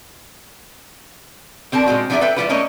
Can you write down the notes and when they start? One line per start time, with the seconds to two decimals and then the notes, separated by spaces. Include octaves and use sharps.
1.72 D3 C4 A#4 A5
1.86 A#2 G#3 C4 F#4
2.10 F3 F#3 D4 G#4 D5 E5
2.21 A4 B4 E5 G5
2.36 E3 F3 G3 F4 G4 B4
2.49 A3 A#3 C#4 C#5 D#5